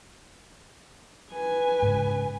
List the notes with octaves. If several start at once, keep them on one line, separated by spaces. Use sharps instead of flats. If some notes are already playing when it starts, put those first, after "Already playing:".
B4 G#5
G#2 C#3